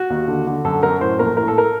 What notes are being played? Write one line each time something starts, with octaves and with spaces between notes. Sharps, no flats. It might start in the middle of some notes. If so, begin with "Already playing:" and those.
Already playing: F#4
D#2
D3
D3
F#2 A4
F#2 A#4
A2 C5
A#1 A#4
A2 A#4
A4
A#4